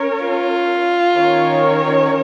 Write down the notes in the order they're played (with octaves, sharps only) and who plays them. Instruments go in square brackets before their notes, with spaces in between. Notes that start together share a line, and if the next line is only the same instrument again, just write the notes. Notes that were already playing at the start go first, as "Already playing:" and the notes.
Already playing: [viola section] C#4 A#4 C#5
[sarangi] F4
[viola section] D#3 C#4 A#4 C#5